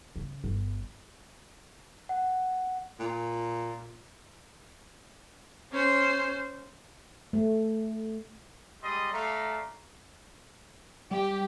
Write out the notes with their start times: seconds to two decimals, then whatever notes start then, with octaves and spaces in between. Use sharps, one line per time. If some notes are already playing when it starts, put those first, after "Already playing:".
0.16 C#3
0.44 G1
2.09 F#5
2.99 A#2
5.72 C#4 C5
7.33 A3
8.83 G3 G#3 D5 D#5 C6 D#6
9.13 A3 D5 F5 A#5
11.11 G3 G4